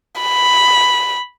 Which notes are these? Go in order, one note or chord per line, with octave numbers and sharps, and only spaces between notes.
B5